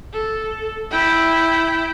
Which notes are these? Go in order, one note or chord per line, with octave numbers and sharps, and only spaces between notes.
A4
E4 G5